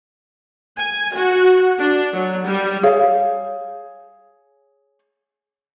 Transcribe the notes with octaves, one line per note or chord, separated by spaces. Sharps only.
G#5
F#4
D4
F#3
G3
G#4 C#5 F5